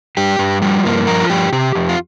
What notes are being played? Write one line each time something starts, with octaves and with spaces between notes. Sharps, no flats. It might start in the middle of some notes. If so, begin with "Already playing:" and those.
G2 G4
G2
F3 G3
G2 A#3
F3 A#4
F4
G2 G4
C3 G4
F2
F4